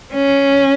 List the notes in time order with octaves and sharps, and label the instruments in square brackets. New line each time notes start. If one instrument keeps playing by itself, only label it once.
[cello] C#4